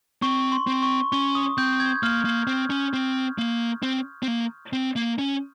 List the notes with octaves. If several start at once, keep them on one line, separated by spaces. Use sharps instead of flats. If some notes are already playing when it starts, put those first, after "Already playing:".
C4 C#6
C6
C4
C#6
C#4 C#6
D#6
C4 G6
G#6
A#3 F6
A#3
C4
C#4
C4
A#3
C4
C4
A#3
C4
A#3
C#4